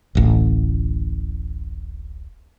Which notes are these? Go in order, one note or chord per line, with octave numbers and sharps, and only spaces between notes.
D1 A1